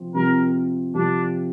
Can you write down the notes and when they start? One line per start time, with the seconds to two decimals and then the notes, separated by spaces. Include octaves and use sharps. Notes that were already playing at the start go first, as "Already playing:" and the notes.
Already playing: C3 F3 C4
0.14 C3 F3 C4 G4 A#4
0.94 C3 F3 C4 D4 G4